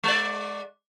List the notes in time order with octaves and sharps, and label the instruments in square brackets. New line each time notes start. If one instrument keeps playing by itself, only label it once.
[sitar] G#3 D5